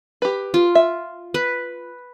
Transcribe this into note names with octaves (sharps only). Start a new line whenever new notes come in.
G4 B4
F4
E5
B4